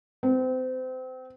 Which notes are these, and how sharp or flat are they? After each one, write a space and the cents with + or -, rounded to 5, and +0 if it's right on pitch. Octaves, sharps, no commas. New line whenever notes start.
C4 -30